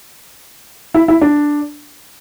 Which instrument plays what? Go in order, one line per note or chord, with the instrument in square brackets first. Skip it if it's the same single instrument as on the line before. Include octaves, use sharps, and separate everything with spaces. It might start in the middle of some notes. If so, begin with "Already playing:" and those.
[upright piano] E4
E4
D4